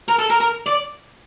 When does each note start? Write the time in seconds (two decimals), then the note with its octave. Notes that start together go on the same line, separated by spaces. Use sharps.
0.08 A#4
0.19 A4
0.30 A#4
0.41 A#4
0.66 D5